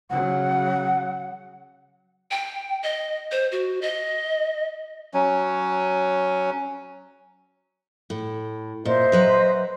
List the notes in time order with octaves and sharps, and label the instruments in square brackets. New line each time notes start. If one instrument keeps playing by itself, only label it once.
[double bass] C#3 F#3 [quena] F#5
[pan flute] G5
D#5
C5
F#4
D#5
[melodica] F#3 C#4
[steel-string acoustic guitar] A2
[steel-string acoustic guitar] A#2 [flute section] C5 D#5 E5
[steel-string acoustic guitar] F#3 B4 A#5